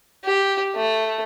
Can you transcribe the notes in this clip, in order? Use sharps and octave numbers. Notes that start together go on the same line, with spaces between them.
G4
A3